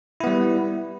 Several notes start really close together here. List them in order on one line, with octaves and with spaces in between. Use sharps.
E4 B3 G3